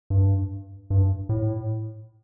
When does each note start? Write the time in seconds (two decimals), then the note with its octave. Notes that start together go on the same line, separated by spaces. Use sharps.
0.10 G2
0.90 G2
1.29 A2